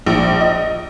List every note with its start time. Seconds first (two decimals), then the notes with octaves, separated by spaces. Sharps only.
0.06 A#1
0.41 D#5